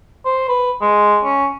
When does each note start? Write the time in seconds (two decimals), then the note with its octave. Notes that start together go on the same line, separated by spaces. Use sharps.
0.25 C5
0.48 B4
0.81 G#3
1.24 C#4